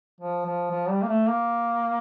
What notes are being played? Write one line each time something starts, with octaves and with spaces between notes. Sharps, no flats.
F3
F3
F3
G3
A#3
A3
A#3